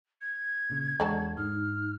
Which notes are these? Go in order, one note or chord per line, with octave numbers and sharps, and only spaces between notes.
G#6
A#2 C#3
E2 D3 F#3 G#3 A5
G#2 D#4 F6